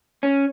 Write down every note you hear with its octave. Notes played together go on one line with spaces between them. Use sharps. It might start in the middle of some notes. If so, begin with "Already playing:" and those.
C#4